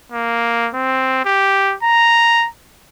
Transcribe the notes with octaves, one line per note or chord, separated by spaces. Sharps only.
A#3
C4
G4
A#5